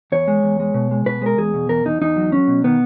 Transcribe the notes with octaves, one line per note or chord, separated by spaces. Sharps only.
E2 C#5
G#3
E2
G#3
B2
G#3
B2 B4
G#3 A#4
E2 G#4
B2
E2 A#4
E2 D#4
E2 D#4
F#3
F#3 C#4
B2
D#3 B3